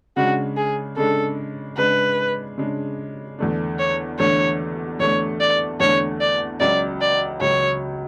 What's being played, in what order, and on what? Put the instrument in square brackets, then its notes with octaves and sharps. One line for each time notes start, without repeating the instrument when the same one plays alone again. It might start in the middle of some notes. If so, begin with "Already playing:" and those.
[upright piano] C#3 G#3 D4 [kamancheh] F#4
[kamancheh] G#4
[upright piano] C#3 G#3 D4 [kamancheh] A4
[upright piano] C#3 G#3 D4 [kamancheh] B4
[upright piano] C#3 G#3 D4
E2 D3 A3 D4
[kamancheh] C#5
[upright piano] E2 D3 A3 D4 [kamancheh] C#5
[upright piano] E2 D3 A3 D4 [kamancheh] C#5
[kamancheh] D5
[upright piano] E2 D3 A3 D4 [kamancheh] C#5
[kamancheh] D5
[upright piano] C#2 C#3 F#3 [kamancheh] D5
[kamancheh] D5
[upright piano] C#2 C#3 F#3 [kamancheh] C#5